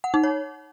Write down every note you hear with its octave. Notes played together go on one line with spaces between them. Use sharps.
F#5
D#4
C#5